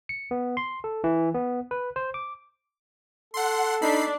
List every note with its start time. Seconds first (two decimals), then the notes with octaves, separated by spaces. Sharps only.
0.09 C#7
0.31 B3
0.57 C6
0.84 A4
1.04 E3
1.34 B3
1.71 B4
1.96 C5
2.14 D6
3.34 A4 F#5 C6
3.82 D4 D#4 B5 C7